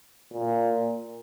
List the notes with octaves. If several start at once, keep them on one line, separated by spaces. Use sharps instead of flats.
A#2